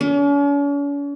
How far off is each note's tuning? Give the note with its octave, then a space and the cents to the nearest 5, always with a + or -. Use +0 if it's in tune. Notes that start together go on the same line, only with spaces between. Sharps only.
C#4 +45